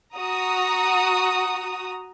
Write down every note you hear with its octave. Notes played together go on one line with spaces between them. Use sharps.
F#4 A#5 D#6